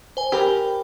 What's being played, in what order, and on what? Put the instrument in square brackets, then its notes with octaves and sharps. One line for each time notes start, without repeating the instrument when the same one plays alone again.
[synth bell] C5 G#5
[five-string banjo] G4 A#4 [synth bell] G5 B5